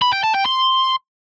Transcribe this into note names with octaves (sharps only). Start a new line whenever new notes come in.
B5
G5
A5
G5
C6